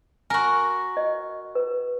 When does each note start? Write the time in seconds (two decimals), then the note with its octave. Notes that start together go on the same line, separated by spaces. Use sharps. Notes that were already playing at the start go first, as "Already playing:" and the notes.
0.30 F#4 A#4 G#5
0.97 D#5
1.55 B4